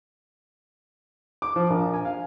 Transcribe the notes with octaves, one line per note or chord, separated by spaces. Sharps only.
D6
F3
A#1
G#5
F5